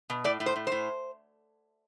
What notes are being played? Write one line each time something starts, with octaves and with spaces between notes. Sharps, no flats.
B2
A2 D5
A2
C5
A2
A2 C5